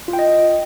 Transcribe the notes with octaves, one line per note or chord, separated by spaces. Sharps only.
F4
G5
D#5